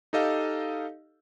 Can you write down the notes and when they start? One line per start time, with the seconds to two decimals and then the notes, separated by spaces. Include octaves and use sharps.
0.13 D#4 G4 A4 D#5 F5